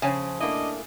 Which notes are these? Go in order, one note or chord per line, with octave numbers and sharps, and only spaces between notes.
C#3 F3 C#5 G#5 A5
A3 A#3 D4 E4 D#5